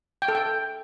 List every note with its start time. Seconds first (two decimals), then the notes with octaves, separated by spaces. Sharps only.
0.22 G5
0.28 A4
0.35 G5